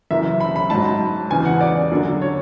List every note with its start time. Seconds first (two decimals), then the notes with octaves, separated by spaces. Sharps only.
0.11 F#2 C#3 E3 E5
0.40 B5
0.56 B5
0.70 G#2 F#3 A5
1.30 E2 C#3 E3 G#5
1.45 F#5
1.61 D5
1.91 F#2 D3 F#3
2.22 C#5